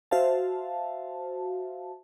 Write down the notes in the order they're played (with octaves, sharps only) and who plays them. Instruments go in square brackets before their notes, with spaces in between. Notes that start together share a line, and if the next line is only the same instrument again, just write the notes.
[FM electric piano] F#4 C5 E5 F5 A5